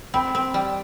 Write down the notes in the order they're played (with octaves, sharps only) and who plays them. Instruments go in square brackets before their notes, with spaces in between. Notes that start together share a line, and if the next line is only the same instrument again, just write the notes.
[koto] C4 [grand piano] B5
[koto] C4
G3